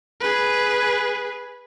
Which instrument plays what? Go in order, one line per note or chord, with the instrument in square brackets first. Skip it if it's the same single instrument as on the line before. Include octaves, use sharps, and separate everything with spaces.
[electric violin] G#4 B4